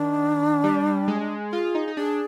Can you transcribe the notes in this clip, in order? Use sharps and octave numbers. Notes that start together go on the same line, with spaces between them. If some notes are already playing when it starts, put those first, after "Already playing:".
Already playing: D#3 D4
G3
G#3
F4 G#4
D#4
D#4
D4 G#4